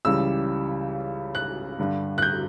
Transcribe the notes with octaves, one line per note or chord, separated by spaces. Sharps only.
C#2 C#3 E3 G3 E6
F#6
G2 D3 G3
F#6
G6